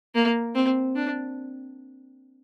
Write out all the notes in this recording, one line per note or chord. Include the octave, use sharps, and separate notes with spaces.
A#3
C4
D4